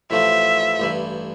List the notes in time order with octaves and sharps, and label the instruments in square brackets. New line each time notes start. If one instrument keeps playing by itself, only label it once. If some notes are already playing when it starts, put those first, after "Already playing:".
[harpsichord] A1 A2 F3 A3 [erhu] E5
[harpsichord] A1 G2 E3